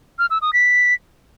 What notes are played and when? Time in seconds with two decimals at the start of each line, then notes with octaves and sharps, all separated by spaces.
0.19 F6
0.30 E6
0.42 D#6
0.53 B6